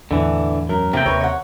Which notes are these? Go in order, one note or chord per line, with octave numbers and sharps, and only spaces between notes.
E2 A2 D3 E3
F#2 A#4
C3 D#3 A3 A#3 G5
D#2 B4 C#5
C#5 F#5